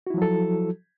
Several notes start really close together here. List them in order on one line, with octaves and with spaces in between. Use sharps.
F#4 E4 F3 F#3 A4